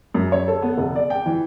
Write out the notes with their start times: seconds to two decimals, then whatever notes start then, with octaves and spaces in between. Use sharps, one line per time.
0.14 F#2
0.32 C#5
0.48 A4
0.62 B3
0.77 F1
0.96 D5
1.10 G5
1.26 E3